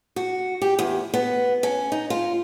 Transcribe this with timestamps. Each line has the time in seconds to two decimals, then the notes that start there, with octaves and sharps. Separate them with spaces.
0.16 F#4
0.62 G4
0.79 E2
1.14 B3
1.63 C#4
1.92 D#4
2.10 F4